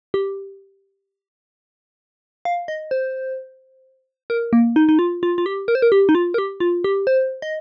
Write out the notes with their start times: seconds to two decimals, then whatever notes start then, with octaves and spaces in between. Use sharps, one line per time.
0.14 G4
2.45 F5
2.68 D#5
2.91 C5
4.30 A#4
4.53 A#3
4.76 D#4
4.89 D#4
4.99 F4
5.23 F4
5.38 F4
5.46 G4
5.68 A#4
5.75 C5
5.82 A#4
5.92 G4
6.09 D#4
6.15 F4
6.34 A#4
6.38 G4
6.60 F4
6.84 G4
7.07 C5
7.42 D#5